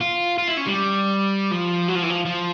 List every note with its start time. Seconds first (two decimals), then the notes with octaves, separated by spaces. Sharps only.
0.01 F4
0.38 F4
0.48 E4
0.57 C#4
0.67 G3
1.51 F3
1.88 F#3
1.95 F3
2.03 E3
2.10 F3
2.25 F3